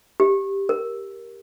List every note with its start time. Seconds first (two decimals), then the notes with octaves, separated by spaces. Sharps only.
0.20 G4
0.69 A#4